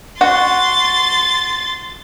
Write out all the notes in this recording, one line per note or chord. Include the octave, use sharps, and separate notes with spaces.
F#4 C6 A6